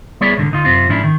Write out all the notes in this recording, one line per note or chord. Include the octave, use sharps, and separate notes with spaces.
G3 B3 E4 G#4 C#5 D5
C2 G#2 D3
D2 D#4 F4
F#2 C3 C4 F4
G#2 F3 C#4 D4 E4
D#3